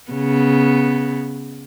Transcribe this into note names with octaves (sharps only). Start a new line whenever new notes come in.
C#3 B3